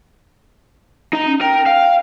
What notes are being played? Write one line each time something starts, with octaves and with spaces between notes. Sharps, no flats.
D#4 A#5
C#4
A#4 G5
F5